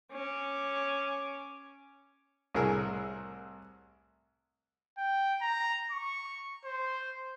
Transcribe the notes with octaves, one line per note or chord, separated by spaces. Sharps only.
C#4 D6
C2 A2 G#4 A#4 E6
G5
A#5
C#6
C5